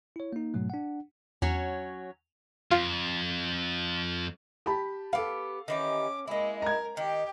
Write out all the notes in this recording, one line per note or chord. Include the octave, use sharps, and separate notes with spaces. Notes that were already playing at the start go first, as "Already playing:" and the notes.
E4 C#5
A#3 D#4
G#2 B2 F#3 A3
D4 F#5
E2 F#3 C#4
F2 F4
G4 A5 B5
B3 G4 A4 F5
D#3 E3 C#4 G4 D6
G#3 A#3 E4 D#5
A#4 A#5 G#6
D#3 G4 G5